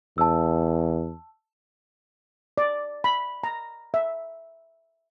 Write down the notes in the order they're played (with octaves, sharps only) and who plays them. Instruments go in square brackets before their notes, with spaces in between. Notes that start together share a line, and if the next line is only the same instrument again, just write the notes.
[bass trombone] E2 [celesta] A5 E6
[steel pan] D5
B5
A#5
E5